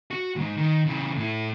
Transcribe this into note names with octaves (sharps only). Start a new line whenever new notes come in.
F#4
D#2 G#2
D#3
C#3 E3
A2 E4